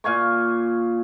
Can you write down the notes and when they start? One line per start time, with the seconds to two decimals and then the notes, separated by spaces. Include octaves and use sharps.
0.04 A#2 F5 G#5 C#6